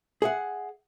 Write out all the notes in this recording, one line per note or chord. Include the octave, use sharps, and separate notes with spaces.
G#4 E5 F#5